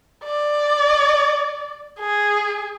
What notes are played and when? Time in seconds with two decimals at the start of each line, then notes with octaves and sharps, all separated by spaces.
0.23 D5
2.00 G#4